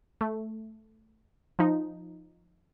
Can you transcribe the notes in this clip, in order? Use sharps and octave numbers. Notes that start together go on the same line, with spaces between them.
A3
F3 D#4